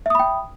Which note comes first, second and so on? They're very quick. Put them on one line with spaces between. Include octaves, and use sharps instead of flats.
E5 D#6 B5 G5